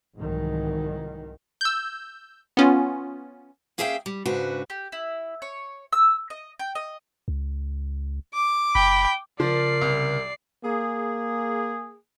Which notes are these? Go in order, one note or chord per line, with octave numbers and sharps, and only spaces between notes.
C2 G#2 D#3 E3 F#3
E6 G6
B3 C#4 F4
A#3 C#4 G#4 E5 F5 G5
G3
G#2 C#3 D4 F#4 B4
G4
E4
C#5
E6
D#5
G5
D#5
C#2
D6
F#1 G5 B5
C#3 F3 A#4 D5 C7
C2
A#3 G#4